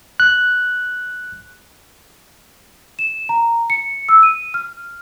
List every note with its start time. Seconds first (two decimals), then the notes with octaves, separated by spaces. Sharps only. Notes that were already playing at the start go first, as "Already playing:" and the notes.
0.20 F#6
2.99 E7
3.29 A#5
3.70 C#7
4.09 E6
4.23 D#7
4.54 F6